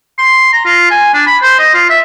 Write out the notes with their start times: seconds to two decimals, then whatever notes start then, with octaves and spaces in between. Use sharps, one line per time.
0.19 C6
0.53 A#5
0.65 F4
0.91 G#5
1.14 D4
1.27 B5
1.42 C5
1.59 D#5
1.74 F4
1.90 E5